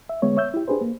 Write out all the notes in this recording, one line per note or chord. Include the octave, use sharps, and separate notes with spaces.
E5
D3 G#3 B3 C#5
C#5 E5 E6 G6
E4 G4
D4 G4 G#4 B4 C5
A#3